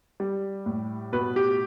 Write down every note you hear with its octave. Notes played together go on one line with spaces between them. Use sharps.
G3
A2
B2 B4
G4